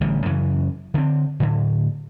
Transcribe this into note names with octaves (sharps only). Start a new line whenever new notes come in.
A1 D3 G3
F#2 C#3 E3
D3 C4
A2 D3